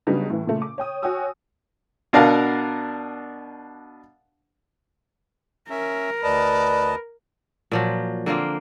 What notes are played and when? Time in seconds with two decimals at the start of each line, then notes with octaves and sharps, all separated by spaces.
0.07 C#3 F#3 G3 B3 D4 D#4
0.30 A2 E3
0.47 A#2 C#3 A3
0.62 D6
0.78 C#5 G5 D#6
1.02 F#4 C#5 G5 G#5 D#6 E6
2.13 B2 D4 A#4 F5 F#5
5.70 C#4 A#4 E5
6.23 D2 B4 D5 D#5 A5
7.71 A#2 F3 F#3
8.26 D3 A#3 C4 F4